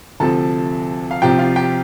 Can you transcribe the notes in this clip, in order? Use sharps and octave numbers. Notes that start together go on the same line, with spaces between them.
D2 C3 F3 A4 A5
F5
C2 C3 F3 G4 G5
F4 F5
G4 G5